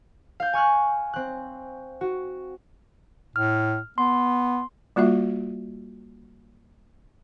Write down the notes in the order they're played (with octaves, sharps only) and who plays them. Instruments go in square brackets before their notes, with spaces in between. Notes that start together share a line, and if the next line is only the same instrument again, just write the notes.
[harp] F5 G6
G#5 C#6 F6 F#6
C4 F#6
F#4
[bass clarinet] A2 [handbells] F6
[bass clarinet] B3 [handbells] C6
[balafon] G3 A#3 F4 F#4 E5